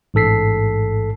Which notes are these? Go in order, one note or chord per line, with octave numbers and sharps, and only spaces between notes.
A1 G#2 A4 B6 C7